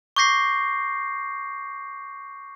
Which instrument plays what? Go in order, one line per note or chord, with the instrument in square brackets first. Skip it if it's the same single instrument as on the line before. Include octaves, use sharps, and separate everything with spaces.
[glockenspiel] C#6 D6 G6 A#6 C7